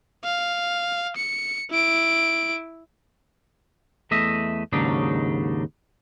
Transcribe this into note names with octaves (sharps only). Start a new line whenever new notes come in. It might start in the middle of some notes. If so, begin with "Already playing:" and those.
F5
C#7
E4 D7
E2 A3 D#5 E5
D#2 G#2 C#3 F#3 D4 D#4